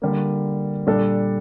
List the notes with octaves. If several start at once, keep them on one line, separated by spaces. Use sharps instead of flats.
D3 G3 A#3
A#2 G3 D4 A4